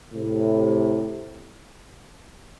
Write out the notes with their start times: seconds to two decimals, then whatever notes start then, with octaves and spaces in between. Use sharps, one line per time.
0.13 A2 C3